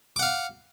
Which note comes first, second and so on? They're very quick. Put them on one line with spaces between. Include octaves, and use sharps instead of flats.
D6 F#5 F5